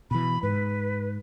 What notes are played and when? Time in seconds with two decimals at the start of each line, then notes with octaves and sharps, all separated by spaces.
0.11 B2 E3 B5
0.43 G#2 B4